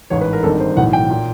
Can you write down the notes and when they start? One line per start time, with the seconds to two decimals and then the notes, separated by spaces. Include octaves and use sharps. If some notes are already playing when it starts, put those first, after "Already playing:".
0.10 A1 G#2 E3 C#5
0.21 B4
0.33 A#4
0.43 G#1 G2 D#3 A4
0.60 C5
0.76 B1 A2 E3 F#5
0.93 G5
1.10 A#2